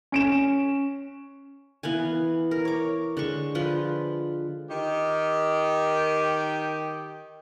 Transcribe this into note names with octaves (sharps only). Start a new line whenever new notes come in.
C#4 D7 E7
E3 B3 F5 G#5
A#4
C#5 D6
D3 G#3 C#6
F3 F4 B4
D#3 G4